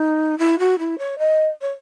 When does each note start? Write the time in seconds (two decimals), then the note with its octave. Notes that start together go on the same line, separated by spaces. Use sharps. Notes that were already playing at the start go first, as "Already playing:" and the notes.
Already playing: D#4
0.38 E4
0.59 F#4
0.79 E4
0.98 C#5
1.19 D#5
1.62 C#5